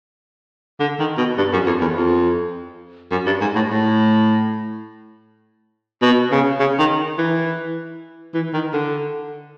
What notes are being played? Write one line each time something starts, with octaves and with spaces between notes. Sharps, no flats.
D3
D#3
B2
G2
F#2
F2
E2
F2
F#2
G2
G#2
A2
A2
B2
C#3
C#3
D#3
E3
E3
D#3
D3